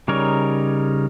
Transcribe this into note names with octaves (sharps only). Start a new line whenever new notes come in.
C#3 G3 D#4 A#4 C#5